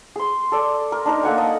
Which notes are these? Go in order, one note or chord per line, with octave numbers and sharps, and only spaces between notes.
G#4 C6
A4 D5
A#4
D4 D#4 A#4
A#3 A4 F#5 G#5
D#5 A5